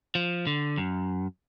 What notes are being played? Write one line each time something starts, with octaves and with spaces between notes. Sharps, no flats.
F3
D3
F#2